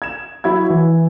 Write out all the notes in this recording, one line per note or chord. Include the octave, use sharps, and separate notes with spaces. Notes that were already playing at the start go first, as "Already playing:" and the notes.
G#6 E7
F#3 E4 F#4 G#6
E3